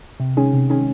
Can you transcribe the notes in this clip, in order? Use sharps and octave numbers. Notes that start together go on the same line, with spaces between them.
C3
D#3 G#3 C#4 G#4
C3
D#3 G#3 C#4 G#4